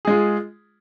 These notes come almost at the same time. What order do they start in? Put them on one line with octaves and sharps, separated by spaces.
G#4 G#3 F4